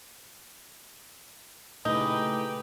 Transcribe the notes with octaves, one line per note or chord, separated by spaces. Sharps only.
A#2 C#3 A3 D#4 E4 G4 G#4 B4